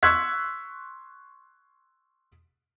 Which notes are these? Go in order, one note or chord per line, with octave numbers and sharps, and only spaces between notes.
C6 C#6 E6 F#6 G#6 B6